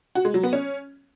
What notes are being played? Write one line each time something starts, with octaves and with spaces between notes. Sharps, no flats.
F#4
G#3
F#3
B3
C#4